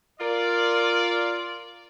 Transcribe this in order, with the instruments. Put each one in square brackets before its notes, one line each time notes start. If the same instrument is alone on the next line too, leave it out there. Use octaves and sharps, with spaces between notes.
[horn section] F4 A#4 D5